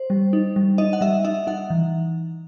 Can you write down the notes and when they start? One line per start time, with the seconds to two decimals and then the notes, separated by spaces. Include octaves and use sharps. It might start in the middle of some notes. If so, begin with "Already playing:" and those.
Already playing: C5
0.10 G3
0.33 D#4
0.56 G3
0.78 D#4 D#5
0.93 F#5
1.01 G3 E5
1.24 D#4 E5
1.47 D#4 F#5
1.70 E3